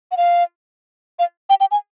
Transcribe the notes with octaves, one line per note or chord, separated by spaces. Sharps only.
F#5
F5
F5
G5
G5
G#5